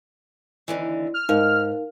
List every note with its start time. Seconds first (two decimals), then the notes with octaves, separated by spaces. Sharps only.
0.68 D#2 D3 E3
1.14 F6
1.29 G#2 D#4 A#4 F5